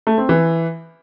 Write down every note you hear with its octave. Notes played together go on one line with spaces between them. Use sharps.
A3
C4
E3